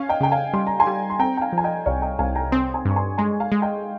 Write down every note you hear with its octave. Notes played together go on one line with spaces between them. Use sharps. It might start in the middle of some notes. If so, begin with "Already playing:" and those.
Already playing: C#4 F5 G#5
D#5 G5
C#3 G5
F5 G#5
G3 C6
A#5
G#5 C6
G3
C6
C4 G5 A#5
G5
F5 G#5
F3
G#5
D#5 G5
C2 C#5 F5
D#5 G5
C2 F5 G#5
G5 A#5
C4 C6 D#6
G#5 C6
G2
C#6
G#5 C6
G#3 G#5 C6
F5 G#5
G#3
D#5 G5